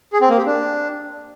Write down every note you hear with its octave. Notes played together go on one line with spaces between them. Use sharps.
G#4
C4
A#3
G4
D4